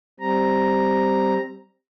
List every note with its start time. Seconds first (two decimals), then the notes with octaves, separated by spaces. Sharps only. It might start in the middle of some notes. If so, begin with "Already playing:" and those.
0.20 G3 C4 A#5